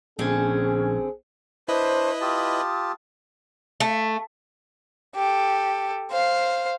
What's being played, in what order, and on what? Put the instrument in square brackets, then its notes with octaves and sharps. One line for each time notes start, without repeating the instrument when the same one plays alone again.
[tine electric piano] A#1 G#6 [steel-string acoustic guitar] D3 C4 [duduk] C#4 [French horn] G#4
[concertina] D4 [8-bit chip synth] E4 B4 D#5 [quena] C5
[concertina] F4 G4 A5 [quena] D#6
[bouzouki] A3
[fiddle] G4 A4
C5 F5